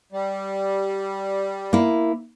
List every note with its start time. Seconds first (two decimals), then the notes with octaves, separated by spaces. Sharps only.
0.12 G3
1.73 A#3 E4